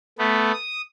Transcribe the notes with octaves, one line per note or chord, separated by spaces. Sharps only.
A3 B3
D#6